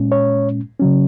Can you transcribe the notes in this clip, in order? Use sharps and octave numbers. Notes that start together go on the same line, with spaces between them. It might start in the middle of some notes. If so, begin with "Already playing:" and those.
Already playing: A#2 G#3 C#4
C#5
C#3 F#3 C#4